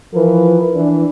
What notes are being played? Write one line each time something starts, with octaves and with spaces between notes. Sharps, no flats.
E3 F3 A#4 B4
E3 D4